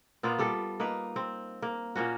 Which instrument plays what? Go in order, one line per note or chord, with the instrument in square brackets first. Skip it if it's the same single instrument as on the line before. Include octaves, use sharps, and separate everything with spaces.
[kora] A#2 A#3 B3 F4
G3 G4 A4
A#3 D#4 B4
C4
A#3
A#2 A#3 C#4 F#4